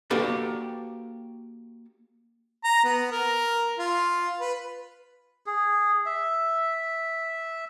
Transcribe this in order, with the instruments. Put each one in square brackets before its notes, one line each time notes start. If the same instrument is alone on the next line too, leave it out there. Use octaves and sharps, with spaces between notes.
[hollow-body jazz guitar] A#3 D4 F#4 G4 A4 B4
[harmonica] A#5
B3
A#4
F4
B4
[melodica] G#4
E5